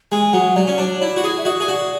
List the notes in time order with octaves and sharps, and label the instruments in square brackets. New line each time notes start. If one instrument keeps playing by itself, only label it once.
[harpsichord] G#3 [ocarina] G#5
[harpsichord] F#3 [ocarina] F#5
[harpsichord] F#3 [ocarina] D5
[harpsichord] C#4
[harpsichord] D4 [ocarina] C#5
[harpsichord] E4 [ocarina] D5
[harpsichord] F#4
G#4
[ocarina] E5
[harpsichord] F#4 [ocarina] D5
[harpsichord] G#4
F#4